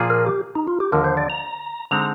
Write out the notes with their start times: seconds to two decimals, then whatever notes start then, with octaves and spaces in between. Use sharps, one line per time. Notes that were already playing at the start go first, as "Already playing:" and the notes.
Already playing: A#2 F3 A#3 F4 G#4
0.10 A#4
0.26 G4
0.55 D#4
0.67 F4
0.80 G4
0.92 D#2 D3 F3 A#4
1.04 C5
1.17 D5
1.30 A#5
1.91 D3 G#3 C4 D#4 A#5